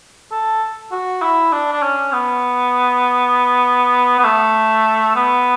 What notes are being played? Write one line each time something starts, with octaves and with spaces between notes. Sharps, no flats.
A4
F#4
E4
D4
D4
C#4
B3
B3
A3
B3